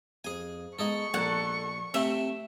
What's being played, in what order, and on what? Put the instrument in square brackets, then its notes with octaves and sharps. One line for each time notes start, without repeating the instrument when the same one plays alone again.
[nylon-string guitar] F2 [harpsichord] G#4 G#5
[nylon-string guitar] G#3 B3 [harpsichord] D#4 G#4 A4 [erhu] C#6
[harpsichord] A#1 [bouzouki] A4 F#5 [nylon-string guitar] A#4 D5
[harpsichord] C3 A3 C4 [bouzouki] E5